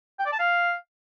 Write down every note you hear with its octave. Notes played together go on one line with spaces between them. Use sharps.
G5
D5
A5
F5